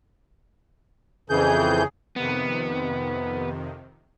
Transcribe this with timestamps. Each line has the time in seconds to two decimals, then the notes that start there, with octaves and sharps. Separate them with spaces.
1.30 F2 C#3 E3 G#4 G6
2.16 F2 C3 D#3 B3